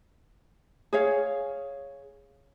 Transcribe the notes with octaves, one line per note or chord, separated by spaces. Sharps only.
G#4 C#5 F5